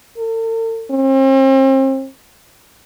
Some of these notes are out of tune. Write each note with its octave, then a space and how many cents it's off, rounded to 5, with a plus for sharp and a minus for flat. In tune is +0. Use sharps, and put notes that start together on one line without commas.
A4 +45
C4 +40